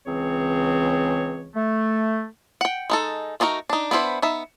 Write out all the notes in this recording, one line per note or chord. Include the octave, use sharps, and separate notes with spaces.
C#2 E3 C4 G#4 C#5
A3
F#5 G5
G#3 D#4 A4
A3 D4 D#4 F#4 A#4
D4 D#4
B3 D4 E4 C5
B3 D#4 E5